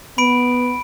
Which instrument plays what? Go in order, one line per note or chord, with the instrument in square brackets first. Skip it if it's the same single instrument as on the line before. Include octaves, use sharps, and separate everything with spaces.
[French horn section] B3 [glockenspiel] B5 D7